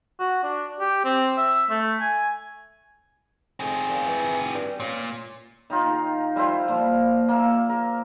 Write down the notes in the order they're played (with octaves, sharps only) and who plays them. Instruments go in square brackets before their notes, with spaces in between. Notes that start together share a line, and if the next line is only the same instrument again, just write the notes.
[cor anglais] F#4
D4
G4
C4
E5
A3
G#5
[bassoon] F2 [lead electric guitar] C4 G#4
[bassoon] A#2
E3
G2
[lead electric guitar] A#2 [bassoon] C#4
[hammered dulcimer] D#3 D#4 F4
A#5
G3 E4 F4 C5
A#2 F3
A#3 E5
A#4